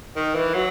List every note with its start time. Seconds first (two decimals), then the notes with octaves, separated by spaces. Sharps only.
0.16 D#3
0.35 E3
0.54 F#3